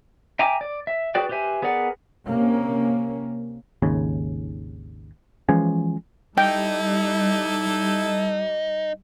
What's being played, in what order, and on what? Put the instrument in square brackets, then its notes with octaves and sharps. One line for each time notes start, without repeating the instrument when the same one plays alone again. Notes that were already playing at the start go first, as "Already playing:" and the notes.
[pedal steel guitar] E5 G5 G#5 A#5 D6
D5
E5
F#4 G#4 B4 D5 G5
G4 B4 C5 E5 G#5
B3 G#4 A#4 D5 F#5
[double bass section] C3 A#3 C#4
[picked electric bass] G#1 D#2 C#3
E3 F3 G#3 C#4
[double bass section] G3 [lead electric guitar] D#4 [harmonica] E4 A4 [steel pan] G5